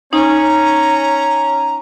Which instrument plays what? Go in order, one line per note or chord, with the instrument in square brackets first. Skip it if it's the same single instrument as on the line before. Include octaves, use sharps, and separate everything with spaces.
[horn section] C#4 [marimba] D#4 [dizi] A#5